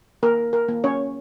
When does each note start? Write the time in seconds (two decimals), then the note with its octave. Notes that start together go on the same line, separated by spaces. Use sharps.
0.23 A#3 A#4
0.53 A#4
0.68 A#3
0.84 C#4 C#5